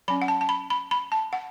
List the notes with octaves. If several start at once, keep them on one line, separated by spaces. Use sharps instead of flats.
F#3 C#4 B5
F#5
A5
A5
B5
B5
B5
A5
F#5